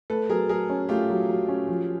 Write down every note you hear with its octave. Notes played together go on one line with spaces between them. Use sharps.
A3 A4 B4
F#3 G#4 A#4
F#3 G#4 A#4
C#4
A3 F4 G4
F#3
F#3
C#4
F3